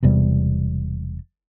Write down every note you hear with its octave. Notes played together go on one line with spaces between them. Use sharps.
E1 E2 C3 G3